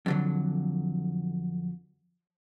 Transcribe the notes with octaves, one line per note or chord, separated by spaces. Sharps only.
F2 D3 F#3